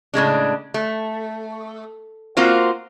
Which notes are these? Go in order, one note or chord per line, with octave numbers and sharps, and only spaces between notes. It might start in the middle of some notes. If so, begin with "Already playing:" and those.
A2 C#3 G#3 D4
A3
A#3 C4 F4 F#4 C5